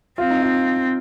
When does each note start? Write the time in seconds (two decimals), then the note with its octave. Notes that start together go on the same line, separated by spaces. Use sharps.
0.18 C4 F4
0.30 D#4
0.42 F4